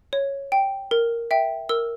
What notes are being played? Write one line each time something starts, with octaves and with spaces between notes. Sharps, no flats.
C#5
G5
A#4
E5 G5
A#4 E6